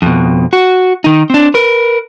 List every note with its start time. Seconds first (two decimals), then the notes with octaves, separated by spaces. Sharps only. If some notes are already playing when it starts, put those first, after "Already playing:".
0.02 F2 B2
0.53 F#4
1.04 D#3 D#4
1.30 C4 D4
1.54 A#4 B4